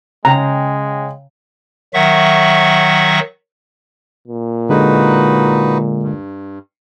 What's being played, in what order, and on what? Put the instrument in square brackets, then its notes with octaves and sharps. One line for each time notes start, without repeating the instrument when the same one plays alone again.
[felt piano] C#3 G5 [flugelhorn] G#3 [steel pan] A#5
[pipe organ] D#3 F#3 E5 F#5 C#6
[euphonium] A#2
[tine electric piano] D3 G#3 [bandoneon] D#4 F#4 B4
[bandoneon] G2